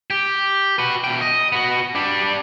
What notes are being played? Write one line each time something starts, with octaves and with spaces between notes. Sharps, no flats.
G4
F#4 B4
B2 G5
D#5
B3 F#4
G3 D4